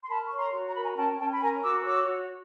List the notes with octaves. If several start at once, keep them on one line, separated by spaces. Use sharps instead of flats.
C6
A#4 A5 B5
C#5 C#6
A#5 C6
F#4
A#5
A#4 B5
G#5 A#5
C#4 G5 A5
C#4 G5 A5
B5
A#4 G#5 A#5
F#4 D6 E6
C#5 D6 E6
F#4